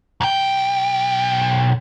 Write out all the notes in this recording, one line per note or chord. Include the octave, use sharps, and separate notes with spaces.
B1 G5